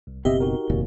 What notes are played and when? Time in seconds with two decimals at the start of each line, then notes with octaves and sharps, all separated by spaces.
0.07 C2
0.25 F#1 B2 C4 G4 D#5 E5
0.40 D#4 F#4 A#4
0.70 F1 D#2 A#2